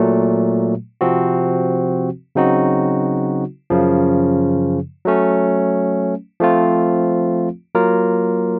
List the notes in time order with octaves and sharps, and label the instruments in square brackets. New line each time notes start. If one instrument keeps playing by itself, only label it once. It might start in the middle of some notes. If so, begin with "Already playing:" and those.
Already playing: [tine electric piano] A#2 F#3 A3
C3 F3 C4 F#4
C#3 F#3 C4 D#4 F#4
F#2 C#3 F3
F#3 A3 C#4
F3 A3 C4 F4
F#3 A#3 F4 A#4